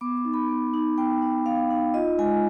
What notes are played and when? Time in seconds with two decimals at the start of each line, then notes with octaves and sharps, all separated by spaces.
0.01 B3 D6
0.17 D6
0.25 D#4
0.34 B5
0.49 B3
0.74 D#4
0.98 B3 G5
1.22 D#4
1.46 B3 F5
1.70 D#4
1.94 F4 D#5
2.18 G#3 G#5